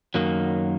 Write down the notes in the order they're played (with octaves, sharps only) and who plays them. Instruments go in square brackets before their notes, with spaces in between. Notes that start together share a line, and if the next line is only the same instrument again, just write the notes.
[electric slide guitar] F#2 D#3 F#3 A#3